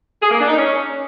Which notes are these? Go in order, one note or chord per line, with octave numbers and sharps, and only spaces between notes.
G#4
A#3
D4
D#4
C#4